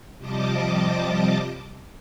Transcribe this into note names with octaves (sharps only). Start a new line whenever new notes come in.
C3 F3 G3 D#5 A5 D6